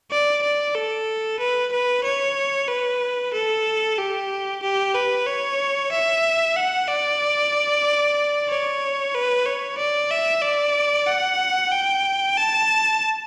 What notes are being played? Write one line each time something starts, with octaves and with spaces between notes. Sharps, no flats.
D5
D5
A4
B4
B4
C#5
B4
A4
G4
G4
B4
C#5
E5
F#5
D5
C#5
B4
C#5
D5
E5
D5
F#5
G5
A5